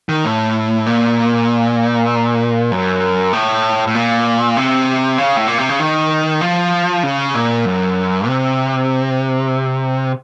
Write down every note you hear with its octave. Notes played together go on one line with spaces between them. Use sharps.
D#3
A2
A#2
F#2
A2
A2
A#2
C3
C#3
A2
A#2
C3
C#3
D#3
F3
C#3
A#2
F#2
C3